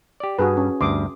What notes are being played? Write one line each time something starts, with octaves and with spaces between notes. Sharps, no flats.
G4 D5
G2 F#4 G#4 B4
C#4
D2 G2 C6 D6 D#6